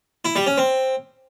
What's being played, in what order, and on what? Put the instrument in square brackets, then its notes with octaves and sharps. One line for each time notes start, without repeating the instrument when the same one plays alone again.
[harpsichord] E4
G3
C#4
C4